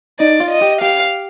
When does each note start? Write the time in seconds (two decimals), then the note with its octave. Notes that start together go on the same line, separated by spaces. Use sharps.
0.20 D#4 D5
0.40 F4
0.51 D#5
0.62 G4
0.81 G4 F5